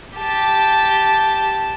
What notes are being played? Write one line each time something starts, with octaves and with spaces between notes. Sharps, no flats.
G4 A5